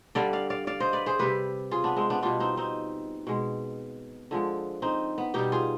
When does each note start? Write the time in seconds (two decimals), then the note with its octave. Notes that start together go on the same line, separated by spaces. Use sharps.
0.15 D3 G3 D5 F5
0.33 D5 F5
0.50 D5 F5
0.67 D5 F5
0.80 C5 D#5
0.93 B4 D5
1.06 G#4 C5
1.19 C3 G3 G4 B4
1.71 F4 G#4
1.84 B3 D4
1.96 G#3 C4
2.10 B3 D4
2.23 B2 G3 D4 F4
2.40 C4 D#4
2.57 C4 D#4
3.27 B2 G#3
4.31 D3 F3 G#3
4.82 C4 D#4
5.18 B3
5.34 B2 G3 D#4 G4
5.52 F4 G#4